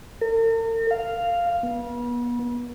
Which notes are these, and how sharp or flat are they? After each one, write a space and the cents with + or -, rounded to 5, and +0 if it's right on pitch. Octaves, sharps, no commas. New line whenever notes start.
A#4 -45
F5 -5
B3 -35